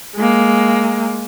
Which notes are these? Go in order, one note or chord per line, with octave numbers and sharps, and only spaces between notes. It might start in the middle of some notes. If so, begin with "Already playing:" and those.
G#3 A#3